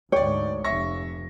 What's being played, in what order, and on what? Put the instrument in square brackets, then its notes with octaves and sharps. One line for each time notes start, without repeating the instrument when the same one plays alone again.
[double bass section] D2 G#2 [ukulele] C#5 [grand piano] D5 G5
[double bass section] F1 [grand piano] E5 C#6 A#6